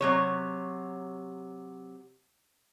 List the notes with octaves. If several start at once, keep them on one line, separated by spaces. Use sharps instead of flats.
C3 F#3 C#5